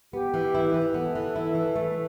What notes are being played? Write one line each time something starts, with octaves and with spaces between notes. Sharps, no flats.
B3 G4
E3
E4
E3
B3 A4
E3
E4
E3
A3